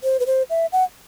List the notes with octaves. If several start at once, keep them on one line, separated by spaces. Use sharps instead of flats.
C5
B4
C5
E5
F#5